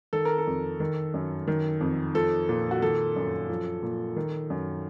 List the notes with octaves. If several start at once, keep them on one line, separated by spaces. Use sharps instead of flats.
D#3 A4
A#4
A4
F2
D#3
F#2
D#3
F2
F3 A4
A#2
F#4
D#3 A4
F#2
F3
A#2
D#3
F#2